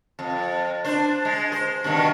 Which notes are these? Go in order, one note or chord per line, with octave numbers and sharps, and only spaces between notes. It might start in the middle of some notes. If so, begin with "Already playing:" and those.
F2
D4 C5
G#3
C5
G2 B2 D#3